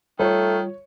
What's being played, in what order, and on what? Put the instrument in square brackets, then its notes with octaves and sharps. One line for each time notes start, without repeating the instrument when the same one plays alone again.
[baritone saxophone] D#3 [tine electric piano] G3 F4 [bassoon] A3 [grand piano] C#5